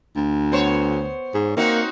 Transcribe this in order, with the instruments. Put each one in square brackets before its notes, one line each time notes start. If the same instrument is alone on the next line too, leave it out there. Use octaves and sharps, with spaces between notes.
[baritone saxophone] D2
[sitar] B3 C5 C#5
[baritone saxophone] G#2
[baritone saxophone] A#3 [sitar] C4 D#4 F#4